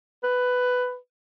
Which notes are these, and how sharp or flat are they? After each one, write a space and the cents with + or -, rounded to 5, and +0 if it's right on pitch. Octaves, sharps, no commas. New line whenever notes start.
B4 +10